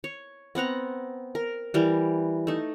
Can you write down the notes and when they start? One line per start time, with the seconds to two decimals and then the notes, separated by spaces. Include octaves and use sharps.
0.04 C#5
0.55 B3 C4 F#5 A#5
1.35 A#4
1.74 E3 G3 A#4
2.47 A3 D#4